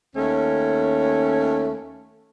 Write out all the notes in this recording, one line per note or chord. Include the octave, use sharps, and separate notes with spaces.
D#2 A3 C#4